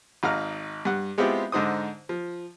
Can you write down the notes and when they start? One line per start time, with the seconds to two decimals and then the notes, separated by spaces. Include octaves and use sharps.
0.23 G#1 D#4 F5 F#5 A#5 F6
0.85 G2 F#5
1.18 G#3 B3 C4 E4 F4 G4
1.52 G#2 D3 D#4 C5 D#6
2.09 F3